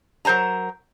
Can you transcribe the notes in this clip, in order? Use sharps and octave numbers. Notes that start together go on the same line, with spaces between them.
F#3 A#4 C5 A5 A#5